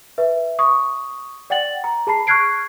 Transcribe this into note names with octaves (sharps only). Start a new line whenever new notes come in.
B4 E5
C#6 D#6
D5 F#5 G5 A6 F#7
A#5
G#4 A5 B5 C7
C#6 F6 F#6 G#6 C7 D7